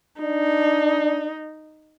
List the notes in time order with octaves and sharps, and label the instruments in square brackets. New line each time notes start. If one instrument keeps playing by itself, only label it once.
[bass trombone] D4 [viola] D#4